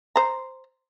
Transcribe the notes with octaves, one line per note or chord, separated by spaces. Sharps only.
C5 A#5